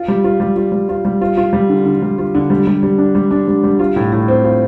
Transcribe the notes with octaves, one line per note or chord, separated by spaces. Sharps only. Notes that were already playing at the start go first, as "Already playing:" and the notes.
Already playing: F4
G3
F4
G3
F4
G3
F4
G3
F4
F4
G3
D3
D3
G3
F4
D3
G3
G3
G3
D4
G3
D4
G3
G3
F4
A2
A2
C4
F4